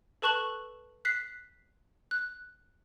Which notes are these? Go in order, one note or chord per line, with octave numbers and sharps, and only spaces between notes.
A4 B4 A5 C#6 F#6 F#7
F#6 B6 C7
F#6